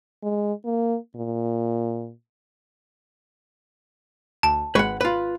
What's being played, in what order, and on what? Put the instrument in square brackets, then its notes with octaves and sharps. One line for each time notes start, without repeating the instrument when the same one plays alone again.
[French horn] G#3
A#3
A#2
[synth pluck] D2 D7 [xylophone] A5
[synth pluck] G#1 G#3 C#6 [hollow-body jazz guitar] B4 F#5
[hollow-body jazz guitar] F4 B4